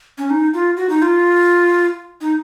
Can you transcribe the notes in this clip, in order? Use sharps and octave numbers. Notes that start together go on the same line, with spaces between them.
C#4
D#4
F4
F#4
D#4
F4
D#4